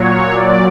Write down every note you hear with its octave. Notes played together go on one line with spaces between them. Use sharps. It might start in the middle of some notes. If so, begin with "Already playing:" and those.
Already playing: A#2 F#3 C#5
D5